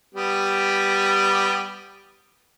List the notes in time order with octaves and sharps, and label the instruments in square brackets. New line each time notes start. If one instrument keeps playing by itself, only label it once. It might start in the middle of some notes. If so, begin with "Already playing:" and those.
[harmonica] G3 B3 G4